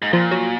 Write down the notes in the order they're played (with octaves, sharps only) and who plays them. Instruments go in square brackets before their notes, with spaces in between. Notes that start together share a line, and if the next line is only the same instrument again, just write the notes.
[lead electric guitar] G#2
[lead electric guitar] A#2 [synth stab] F3
[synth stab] F#3